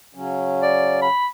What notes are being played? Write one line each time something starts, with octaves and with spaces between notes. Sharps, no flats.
C#3 F#3 C#4
D5
B5